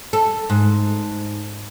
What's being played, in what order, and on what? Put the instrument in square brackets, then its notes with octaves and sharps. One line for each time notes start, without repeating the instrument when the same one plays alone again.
[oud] A4
G#2